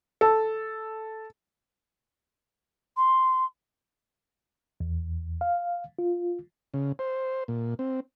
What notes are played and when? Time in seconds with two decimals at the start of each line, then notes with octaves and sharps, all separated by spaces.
0.21 A4
2.96 C6
4.80 E2
5.41 F5
5.99 F4
6.74 C#3
6.99 C5
7.48 A#2
7.79 C4